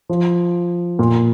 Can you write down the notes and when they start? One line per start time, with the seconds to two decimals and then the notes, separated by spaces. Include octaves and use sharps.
0.09 F3
0.99 A#2